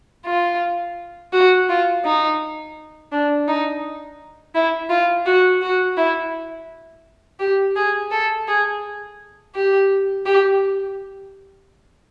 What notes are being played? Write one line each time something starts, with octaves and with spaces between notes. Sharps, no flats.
F4
F#4
F4
D#4
D4
D#4
E4
F4
F#4
F#4
E4
G4
G#4
A4
G#4
G4
G4